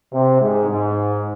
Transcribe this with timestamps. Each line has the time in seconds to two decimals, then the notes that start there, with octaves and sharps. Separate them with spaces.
0.13 C3
0.41 G#2
0.70 G#2